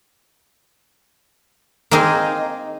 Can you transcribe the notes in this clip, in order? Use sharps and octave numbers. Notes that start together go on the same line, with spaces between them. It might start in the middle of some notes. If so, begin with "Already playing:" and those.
A#3 C4 D#4 G#4 D#5